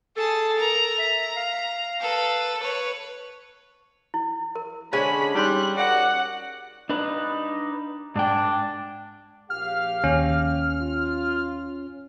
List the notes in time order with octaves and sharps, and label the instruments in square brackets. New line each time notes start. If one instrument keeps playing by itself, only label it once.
[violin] G#4 A5 [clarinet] A4
[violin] A#4 A#5
[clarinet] E5 [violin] A#5
[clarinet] F5
[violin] A4 B4
B4 C#5
[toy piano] E4
A#4
[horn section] D3 G#3 [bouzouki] C#4 G#4 G#5 [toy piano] C5 [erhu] B5
[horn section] G3 [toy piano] D#4 C#5 C6 [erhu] F#6
[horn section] F#4 A#4 D5 [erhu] F#5
[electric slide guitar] D4 B4 [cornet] D#4
[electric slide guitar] G#2 G5 [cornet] D4
[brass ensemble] A#1 G4 F5 [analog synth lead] F6
[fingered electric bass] D#2 [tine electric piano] C#4
[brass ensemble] F4